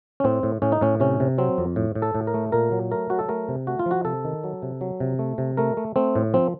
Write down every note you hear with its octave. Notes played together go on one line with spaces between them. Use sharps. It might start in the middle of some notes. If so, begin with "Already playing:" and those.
C#4
A2 C4
A2
A2 C#4
D#4
A2 C#4
C3 C#4
C3
F#3 C4
F2
A2
A2
A4
A2
A#4
A3
A#2 A#4
F#3
A3 A#4
F#3 F#4
A4
A3 A#4
C3
A3 F#4
F4
F3
F#4
C3 A4
D#3
F#3
C3
F#3
C3
A3
C3
A3 A#4
A3
A3 C4
A2
F3 C4